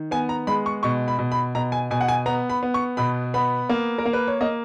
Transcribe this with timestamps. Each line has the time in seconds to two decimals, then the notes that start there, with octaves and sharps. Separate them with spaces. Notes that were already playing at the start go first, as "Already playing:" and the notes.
Already playing: D#3
0.11 B3 G#5
0.29 A#5
0.47 G#3 B5
0.66 C#6
0.83 B2 C#6
1.08 B5
1.19 B2
1.32 B5
1.55 B2 A#5
1.72 G#5
1.91 B2 G#5
2.01 F#5
2.08 G#5
2.26 B3 A#5
2.50 B5
2.63 B3
2.74 C#6
2.97 B2 B5
3.34 B3 B5
3.69 A#3
3.98 A#4
4.06 A#3
4.13 B4
4.27 C#5
4.41 A#3 D#5